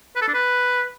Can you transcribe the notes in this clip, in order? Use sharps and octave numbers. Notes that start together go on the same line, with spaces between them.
B4
A4
D4
B4